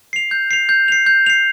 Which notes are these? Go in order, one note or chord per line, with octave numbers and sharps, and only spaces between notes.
C7 F7
G6
C7 F7
G6
C7 F7
G6
C7 F7